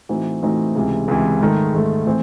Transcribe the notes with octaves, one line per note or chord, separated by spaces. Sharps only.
A2 E3 C4 D#4 F#4
A2 E3 C4 D#4 F#4
C#2 C3 E3
C#2 C3 E3
G#2 D#3 A3
G#2 D#3 A3
A2 E3 C4